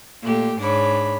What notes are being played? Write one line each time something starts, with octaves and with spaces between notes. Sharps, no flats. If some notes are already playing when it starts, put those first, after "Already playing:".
A#2 A3 G4
G#2 D4 C#5 B5